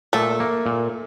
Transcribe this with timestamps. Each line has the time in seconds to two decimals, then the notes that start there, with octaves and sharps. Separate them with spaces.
0.13 A#2 A3 A4
0.40 A#3
0.66 A#2